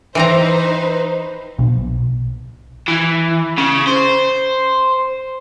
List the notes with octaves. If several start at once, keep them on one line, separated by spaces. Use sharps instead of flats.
E3 C4 D#4 B4 C5 A#5
B1
E3
C#3
C5